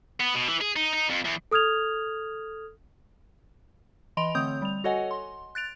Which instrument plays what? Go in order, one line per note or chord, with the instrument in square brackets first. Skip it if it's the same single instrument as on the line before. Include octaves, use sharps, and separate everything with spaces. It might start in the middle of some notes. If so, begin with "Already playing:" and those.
[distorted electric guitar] B3
B2
E3
G#4
D#4
D#4
F2
E2
[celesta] A4 D#6 F6 G#6 F7
[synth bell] E3 D#5 B5 C6 D7 F7
D3 A3 C4 C#5 D#6 G6
G3 F7
F#4 A4 C#5 D#5 F#5 G#5
C6
F#6 A6 D7 F7